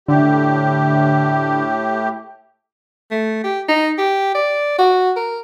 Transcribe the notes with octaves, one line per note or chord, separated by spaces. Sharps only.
A2 D3 G4
A3
G4
D#4
G4
D5
F#4
A#4